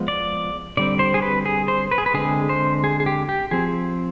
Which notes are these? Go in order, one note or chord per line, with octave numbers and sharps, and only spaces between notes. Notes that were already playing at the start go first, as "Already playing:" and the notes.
Already playing: F3 G#3 B3
D5
D3 G3 C4 D5
C5
G#4
B4
G#4
C5
B4
G#4
B4
D3 G#3 C4 G#4
C5
G#4
G#4
G4
G4
F3 C4 G#4